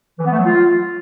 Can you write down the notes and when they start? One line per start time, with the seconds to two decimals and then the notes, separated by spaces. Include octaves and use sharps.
0.19 E3
0.25 B3
0.31 A3
0.38 F#3
0.44 F4